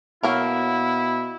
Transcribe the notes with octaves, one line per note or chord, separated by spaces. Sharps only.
B2 F#3 A#3 E4 A#4